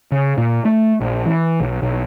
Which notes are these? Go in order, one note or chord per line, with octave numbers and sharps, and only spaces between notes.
C#3
A#2
A3
A#1
E3
B1
B1